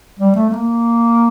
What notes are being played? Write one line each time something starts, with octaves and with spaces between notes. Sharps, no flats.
G3
A3
A3
A#3